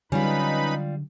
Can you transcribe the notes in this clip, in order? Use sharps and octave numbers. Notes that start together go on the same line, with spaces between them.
D3 F#3 G3 C#4 D#4 F4 B4 B5